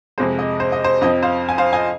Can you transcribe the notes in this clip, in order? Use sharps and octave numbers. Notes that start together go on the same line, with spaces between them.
F2 C3 G#3 C5
D#5
C5
D#5
C5
F2 F3 C4 D#5
C5 F5
G#5
C5 F5
D#5 G#5